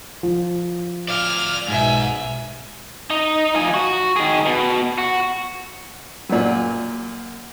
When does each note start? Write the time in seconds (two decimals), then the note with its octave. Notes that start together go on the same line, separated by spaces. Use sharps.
0.23 F3
1.08 D5 F5 F6
1.68 B1 G#2 B2 E5 G#5
3.10 D#4
3.55 F3 G#5
3.74 F#4
4.16 D#3 G#4
4.46 B2
4.98 F#4
6.29 F#2 A#2